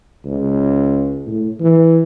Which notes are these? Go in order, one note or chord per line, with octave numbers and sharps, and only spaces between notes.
C#2
A2
E3